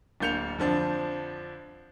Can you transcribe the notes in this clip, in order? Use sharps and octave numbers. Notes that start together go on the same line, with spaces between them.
D1 D3 A#3 G6 C#7 F7
F2 D3 F3 D4